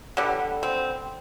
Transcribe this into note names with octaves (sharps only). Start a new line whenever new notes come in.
D3 G3 B3
C4